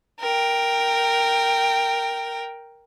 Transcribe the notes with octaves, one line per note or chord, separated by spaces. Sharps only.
A#4 G5